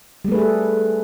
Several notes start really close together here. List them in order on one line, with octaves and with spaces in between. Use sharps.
G3 A3 B4 G#4 A4